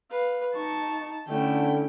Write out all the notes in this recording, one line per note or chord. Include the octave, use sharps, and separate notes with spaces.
B4 F5
D#4 A5 C#6
D3 A3 C#4 E4 G5